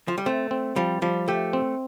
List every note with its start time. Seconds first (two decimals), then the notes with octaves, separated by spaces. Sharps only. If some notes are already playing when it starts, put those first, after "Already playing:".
0.08 F3
0.18 G3
0.26 A3 C4
0.51 C4
0.76 F3 G3
1.02 F3 G3
1.28 A3 G4
1.53 C4